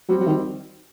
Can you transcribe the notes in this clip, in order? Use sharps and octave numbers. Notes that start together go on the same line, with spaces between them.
F#3 G3 C4
F#3
D#3